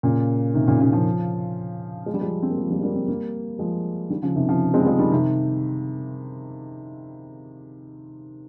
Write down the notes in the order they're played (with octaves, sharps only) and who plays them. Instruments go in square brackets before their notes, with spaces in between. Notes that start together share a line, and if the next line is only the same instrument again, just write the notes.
[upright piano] A#2 C#3
C3 D#3
A#2 C#3
A#2 C#3
C#3 F3
G#3
G3
F3 G#3
C4
A#3
F3 G#3
G3 A#3
G#3
G3 A#3
G#3 C4
G3 A#3
F3 G#3
D#3 G3
C#3 F3
C3 D#3
C#3 F3
G#3 C4
G3
F3 G#3
D#3 G3
C3 D#3